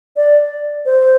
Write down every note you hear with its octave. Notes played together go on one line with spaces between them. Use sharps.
D5
C5